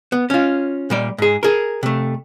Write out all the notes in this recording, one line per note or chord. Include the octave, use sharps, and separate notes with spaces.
B3
C#4 F4
A#2 G3 D5
G#2 G#4
G#4 A#4
C3 A3